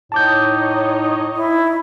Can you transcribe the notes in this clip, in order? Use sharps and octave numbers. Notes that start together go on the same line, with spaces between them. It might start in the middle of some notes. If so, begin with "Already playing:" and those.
A2 D#4 C#5 D#5 A5 D6 G6
E4